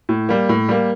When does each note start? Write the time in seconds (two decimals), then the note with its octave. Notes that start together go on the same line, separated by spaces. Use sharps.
0.09 A2
0.29 G3 A#3
0.49 A2
0.69 G3 A#3